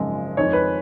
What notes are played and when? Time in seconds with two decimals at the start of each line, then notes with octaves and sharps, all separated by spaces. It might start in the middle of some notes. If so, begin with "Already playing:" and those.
Already playing: G#1 F#2 C#3 F3 G#3
0.37 F2 D#3 G#3 D#4 C#5
0.53 B4